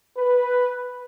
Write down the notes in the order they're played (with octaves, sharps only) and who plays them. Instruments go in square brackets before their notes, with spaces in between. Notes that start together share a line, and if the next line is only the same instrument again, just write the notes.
[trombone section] B4